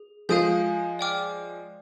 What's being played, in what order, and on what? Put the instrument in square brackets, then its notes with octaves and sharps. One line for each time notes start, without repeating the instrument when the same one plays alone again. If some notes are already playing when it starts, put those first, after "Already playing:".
Already playing: [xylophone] G#4
[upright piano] F3 G#3 [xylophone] F5 G#5 D#6 G6
[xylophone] D5 G5 D6 F6